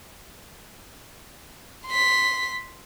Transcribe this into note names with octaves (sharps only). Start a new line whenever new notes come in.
C6 B6